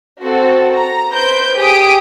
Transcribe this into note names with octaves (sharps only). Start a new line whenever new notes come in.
C4 F#4 A4
A#5
B4 C5 G6 D7
G4 G#4 D#6 B6 D7